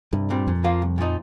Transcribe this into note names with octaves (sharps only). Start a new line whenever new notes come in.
C2 G2
A#2 G3 C4
F2 A#2
F3 A#3 F4
C2
A#2 F3 D#4